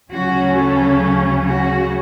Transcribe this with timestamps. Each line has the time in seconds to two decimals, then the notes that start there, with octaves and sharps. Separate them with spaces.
0.12 D2 C#3 F#3 C#4 F#4
0.58 A4
1.48 F#4